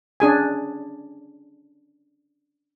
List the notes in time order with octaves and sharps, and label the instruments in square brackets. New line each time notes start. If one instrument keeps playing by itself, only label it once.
[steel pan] C#4 D4 G#4 G#5